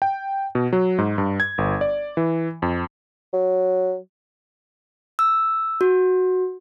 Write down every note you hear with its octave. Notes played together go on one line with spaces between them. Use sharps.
G5
B2
F#3
G#2
G2
G#6
G1
D5
E3
F2
F#3
E6
F#4